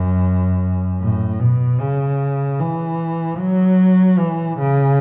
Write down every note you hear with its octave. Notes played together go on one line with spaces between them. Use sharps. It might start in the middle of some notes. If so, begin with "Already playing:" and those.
Already playing: F#2
A2
B2
C#3
E3
F#3
E3
C#3